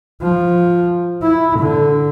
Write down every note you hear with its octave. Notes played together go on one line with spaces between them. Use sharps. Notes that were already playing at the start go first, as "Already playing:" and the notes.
F3
E4
D3